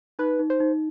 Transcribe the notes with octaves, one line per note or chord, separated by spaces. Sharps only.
D#4 B4
D#4
C5
D#4